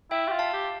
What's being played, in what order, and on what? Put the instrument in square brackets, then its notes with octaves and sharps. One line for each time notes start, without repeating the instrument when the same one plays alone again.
[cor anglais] E4 [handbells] E5 G5
[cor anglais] G4
F4
[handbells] F5 A5
[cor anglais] G4